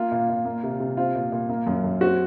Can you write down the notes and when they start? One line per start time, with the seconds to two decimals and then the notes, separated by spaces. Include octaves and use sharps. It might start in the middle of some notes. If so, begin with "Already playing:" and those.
Already playing: A#3 F4
0.12 A#2
0.29 A#2
0.45 A#3
0.63 C3
0.80 C3
0.97 C4 F4
1.15 A#2
1.32 A#2
1.49 A#3
1.67 F#2
1.84 F#2
2.01 C4 F#4